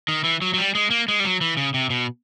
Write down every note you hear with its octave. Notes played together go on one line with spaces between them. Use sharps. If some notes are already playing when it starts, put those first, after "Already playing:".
D#3
E3
F#3
F#3
G3
G#3
A#3
G#3
G3
F#3
E3
C#3
C3
B2